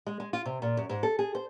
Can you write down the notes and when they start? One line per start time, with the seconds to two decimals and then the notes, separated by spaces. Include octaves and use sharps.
0.06 G#3
0.20 G#3
0.33 F4
0.46 C3
0.62 A#2
0.77 F#2
0.89 G#2
1.03 A4
1.19 G#4
1.35 C5